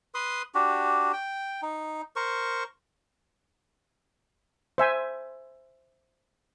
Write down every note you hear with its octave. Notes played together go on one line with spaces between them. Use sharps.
B4 C6 D#6
D4 F#4 G4
G5
D#4
A#4 C5 C#6
C5 E5 G#5